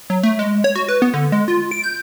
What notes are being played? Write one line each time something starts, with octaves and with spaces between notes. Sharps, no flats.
F#3
A3
G#3
C#5
F#4
B4
B3
D3
G#3
F4
D7
G6